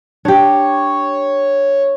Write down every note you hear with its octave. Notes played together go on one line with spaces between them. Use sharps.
D4 G4 C#5